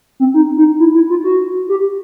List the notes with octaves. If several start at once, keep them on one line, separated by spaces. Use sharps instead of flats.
C4
D#4
D#4
E4
E4
F4
F#4
G4